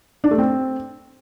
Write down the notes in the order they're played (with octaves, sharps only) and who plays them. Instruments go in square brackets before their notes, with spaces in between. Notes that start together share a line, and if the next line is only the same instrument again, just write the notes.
[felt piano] D4
A3
C4